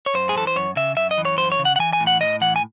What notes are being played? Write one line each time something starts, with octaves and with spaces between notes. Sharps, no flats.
C#5
F#2 C5
G#4
E3 A4
C5
F#2 C#5
C#3 E5
F#2 E5
D#5
E3
C#5
F#2 C5
C#5
C#3
F#5
F#5
E3 G#5
G#5
A2
F#5
A2 D#5
E3 F#5
G#5